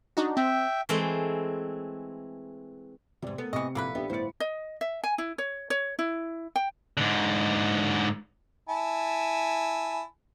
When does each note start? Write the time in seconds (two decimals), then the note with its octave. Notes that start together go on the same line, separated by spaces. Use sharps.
0.17 D4 D#4 F#4
0.37 C4 E5 G5
0.89 E3 G#3 A3 C4
3.22 E2 G#2 C3 D5
3.38 B3 A4 A#4
3.53 C3 E3 D#5 C#6 C#7
3.75 A#1 A#3 E4 F#4 A4 B4
3.95 B3 D4 G4 E5
4.10 G1 A2 B3 C5 D5 C#7
4.40 D#5
4.81 E5
5.04 G#5
5.18 E4
5.38 C#5
5.70 C#5
5.99 E4
6.56 G5
6.97 G#2 D3
8.69 E4 G#5 A5